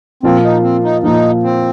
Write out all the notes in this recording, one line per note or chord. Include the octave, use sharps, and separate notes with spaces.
A#2 F3 A#3 C4 F4
D#4
C4
D#4
A#2 F3 A#3 D#4 F4
C4